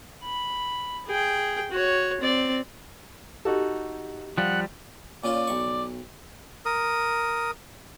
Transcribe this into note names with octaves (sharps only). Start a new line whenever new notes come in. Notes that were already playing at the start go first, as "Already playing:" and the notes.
B5
G#4 G5
F#4 C#5
C4 D5
D#4 F#4 G4 A4
F3 G3 F5 F#5
A#2 C#4 F4 D5
B1 C#6
A#4 D#6